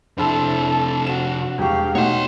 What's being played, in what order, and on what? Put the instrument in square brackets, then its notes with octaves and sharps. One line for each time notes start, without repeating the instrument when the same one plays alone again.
[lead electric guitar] F2 C3 [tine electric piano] D4 [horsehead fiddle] E4 A4 [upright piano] C5 B5 E6
[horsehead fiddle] A4
[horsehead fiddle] F#4 [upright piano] E7
[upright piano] E1 F#4 C#6 [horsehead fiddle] G4 F5
[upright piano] B2 D#4 [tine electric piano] A3 F#5 [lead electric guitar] C#5 C6